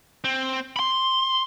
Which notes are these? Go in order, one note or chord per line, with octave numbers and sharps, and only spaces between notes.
C4
B5 C6